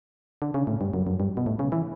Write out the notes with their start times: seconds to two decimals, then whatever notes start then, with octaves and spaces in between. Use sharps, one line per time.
0.42 D3
0.54 C#3
0.67 A2
0.81 G2
0.94 F#2
1.07 F#2
1.20 G2
1.37 B2
1.46 A2
1.59 C#3
1.72 E3